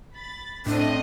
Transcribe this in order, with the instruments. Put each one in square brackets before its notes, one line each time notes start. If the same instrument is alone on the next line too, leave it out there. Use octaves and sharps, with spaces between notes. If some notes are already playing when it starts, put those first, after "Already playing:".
[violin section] B5 A6
[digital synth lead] A2 [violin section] A3 C4 D#5 [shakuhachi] D4